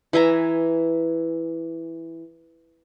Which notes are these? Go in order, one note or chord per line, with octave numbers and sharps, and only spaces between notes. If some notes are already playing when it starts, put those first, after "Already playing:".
E3 E5 G#5 A#5